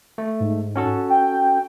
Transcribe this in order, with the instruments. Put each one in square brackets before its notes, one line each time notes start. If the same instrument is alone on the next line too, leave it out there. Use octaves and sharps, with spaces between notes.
[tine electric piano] A3
[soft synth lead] G#2
[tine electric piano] C#4 F#4 A4
[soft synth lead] G5